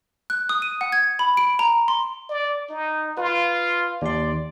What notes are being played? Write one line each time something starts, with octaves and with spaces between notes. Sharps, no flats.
F#6
D#6
D#7
F#5
G#6
B5
D7
A#5
C6
D5
D#4
F4 B4
D#2 D5 C6